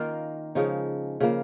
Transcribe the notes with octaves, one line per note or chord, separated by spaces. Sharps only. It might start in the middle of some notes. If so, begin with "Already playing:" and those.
Already playing: D#3 A#3 C#4 F4 A#4
C#3 F3 G#3 D#4
C#3 F3 A#3